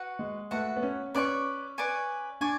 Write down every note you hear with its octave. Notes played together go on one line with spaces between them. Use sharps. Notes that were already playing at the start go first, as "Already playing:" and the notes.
Already playing: F#4 B4 F#5
G#3
A3 F#4 B4 F#5
B3
C#4
C#4 B4 D5 G#5 C#6
B4 D5 G#5 C#6
D4 D5 G#5 C#6